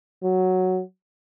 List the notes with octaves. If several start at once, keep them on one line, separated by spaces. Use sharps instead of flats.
F#3